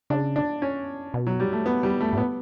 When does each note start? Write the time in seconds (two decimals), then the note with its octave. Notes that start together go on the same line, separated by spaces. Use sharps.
0.10 C#3 D4
0.36 D4
0.62 C#4
1.14 B2
1.27 F#3
1.40 G3
1.52 A3
1.66 B3
1.83 G3
2.00 A3
2.13 G2
2.17 A2 B3